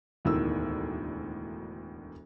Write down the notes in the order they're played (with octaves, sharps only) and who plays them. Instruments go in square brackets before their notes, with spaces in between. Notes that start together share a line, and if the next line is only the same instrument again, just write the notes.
[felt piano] E1 D2 A2 D#3 E6